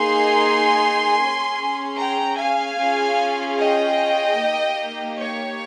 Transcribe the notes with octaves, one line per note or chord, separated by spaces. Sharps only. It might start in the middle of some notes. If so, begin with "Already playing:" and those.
Already playing: A#3 D#4 G#4 G#5 C6
C#4 G#4
G5 A#5
F5 G#5
C#4 F4 G#4
D#5 G5
A#3 D#4 G4
C#5